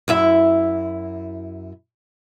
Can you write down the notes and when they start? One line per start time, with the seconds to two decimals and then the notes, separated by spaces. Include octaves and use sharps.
0.08 F#2 E4 E5